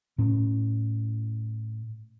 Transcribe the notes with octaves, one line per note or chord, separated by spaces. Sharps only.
A2 C#4